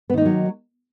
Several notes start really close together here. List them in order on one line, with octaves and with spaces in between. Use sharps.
B3 D#3 D#4 A#3 F#3